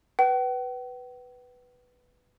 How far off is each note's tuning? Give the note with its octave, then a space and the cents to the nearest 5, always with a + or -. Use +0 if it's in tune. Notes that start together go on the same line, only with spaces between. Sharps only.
B4 +0 G5 -45